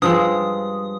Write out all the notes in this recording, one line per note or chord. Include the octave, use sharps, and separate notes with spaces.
G2 F3 G#3 D#6